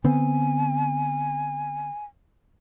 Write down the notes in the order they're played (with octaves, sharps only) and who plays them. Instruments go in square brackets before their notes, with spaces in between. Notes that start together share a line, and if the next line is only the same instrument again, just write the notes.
[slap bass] D3 B3 C4 [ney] G#5